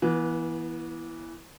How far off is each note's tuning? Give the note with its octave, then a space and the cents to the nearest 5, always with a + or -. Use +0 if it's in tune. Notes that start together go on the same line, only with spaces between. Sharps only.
E3 +0 B3 -30